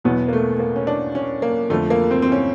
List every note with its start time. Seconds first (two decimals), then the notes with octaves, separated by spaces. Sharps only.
0.04 E2 B2 F#3 B3
0.28 A#3
0.33 A3
0.59 A#3
0.76 C#4
0.87 D4
1.15 C#4
1.42 A#3
1.70 F2 D3 F3 A3
1.90 A#3
2.11 C4
2.22 C4
2.32 C#4